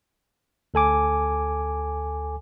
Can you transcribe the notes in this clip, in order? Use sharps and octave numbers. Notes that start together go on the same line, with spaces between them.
D2 A4 G#5 D6